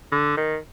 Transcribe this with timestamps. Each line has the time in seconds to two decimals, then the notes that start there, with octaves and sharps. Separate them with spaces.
0.12 D3
0.37 D#3